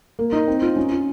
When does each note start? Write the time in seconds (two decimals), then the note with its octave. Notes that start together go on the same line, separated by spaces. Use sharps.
0.19 A#3
0.33 D#4
0.48 C4
0.62 F4
0.76 C#4
0.92 F4